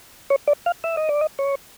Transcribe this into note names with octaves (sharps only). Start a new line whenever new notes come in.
C#5
D5
F5
E5
D#5
D5
D#5
C#5